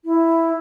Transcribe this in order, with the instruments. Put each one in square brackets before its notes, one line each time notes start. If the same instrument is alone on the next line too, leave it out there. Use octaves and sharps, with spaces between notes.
[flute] E4